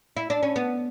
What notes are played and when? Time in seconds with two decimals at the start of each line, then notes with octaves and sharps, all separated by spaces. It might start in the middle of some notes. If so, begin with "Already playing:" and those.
0.17 E4
0.30 D4
0.43 C#4
0.56 B3